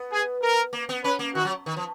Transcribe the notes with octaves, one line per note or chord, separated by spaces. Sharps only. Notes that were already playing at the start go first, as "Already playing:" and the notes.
Already playing: B3
G#4
A#4
A#3
B3
C#4 B4
A#3
D#3 F#4
F#3
D#3
F3